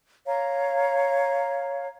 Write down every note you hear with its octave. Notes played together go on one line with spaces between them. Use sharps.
C#5 F5 A#5